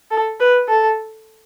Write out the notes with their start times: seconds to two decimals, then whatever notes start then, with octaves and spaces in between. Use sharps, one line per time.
0.11 A4
0.40 B4
0.68 A4